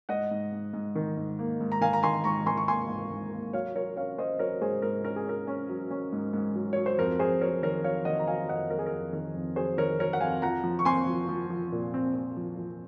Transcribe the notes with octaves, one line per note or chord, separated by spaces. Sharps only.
G#2 D#5 F#5
G#2
G#2
G#2
D#3
G#2
A#3
G#2
A#5
D#3 F5 G#5
A#5
D#3 G#5 C6
G#2 A#5 C#6
D#3 G#5 C6
C#6
A#3 G#5 C6
G#2
G#2
A#3
F#3 C#5 F5
F#3 A#4 C#5
C#4 C#5 F5
C#4 C5 D#5
F#3 A#4 C#5
G#2 G#4 C5
G#2 A#4
C#4 A#4
G#4
C#4 A#4
C#4
F#3
C#4
G#2
G#2
F#3
F#3 C#5
C5
F2 A#4
F2 G#4 C5
F#3 A#4 C#5
D#3 A#4 C#5
F#3 C#5 F5
D#3 D#5 F#5
A#5
F#3 F5 G#5
F2 D#5 F#5
F#3 A#4
G#4
A#4
F2
D#3 A#4
F2
F#3 G#4 C5
D#3 A#4 C#5
F#3 A#4 C#5
F#5
F2 F5 G#5
F3 F#5 A#5
F3
C#6
C4 G#5 C6
F3
F3
F3
A#2
C4
C4
F3
F3